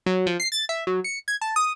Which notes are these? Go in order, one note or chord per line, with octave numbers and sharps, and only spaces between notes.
F#3
F3
C7
A6
E5
F#3
C#7
G#6
A5
D#6